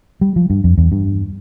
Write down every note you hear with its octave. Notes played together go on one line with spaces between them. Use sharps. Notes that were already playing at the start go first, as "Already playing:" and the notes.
G3
F3
G2
F2
E2
G2